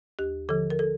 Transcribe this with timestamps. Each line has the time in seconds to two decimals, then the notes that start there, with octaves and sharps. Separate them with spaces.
0.19 D#2 G4
0.49 D3 F3 A4
0.70 A#4
0.79 A4